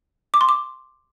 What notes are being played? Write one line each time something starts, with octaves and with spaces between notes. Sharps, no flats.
D6
C6
D6